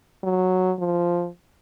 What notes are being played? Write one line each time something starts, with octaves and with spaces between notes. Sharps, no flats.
F#3
F3